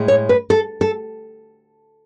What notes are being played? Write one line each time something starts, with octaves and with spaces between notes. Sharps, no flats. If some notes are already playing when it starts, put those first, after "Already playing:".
Already playing: A2 G#3
C#5
B4
A4
A4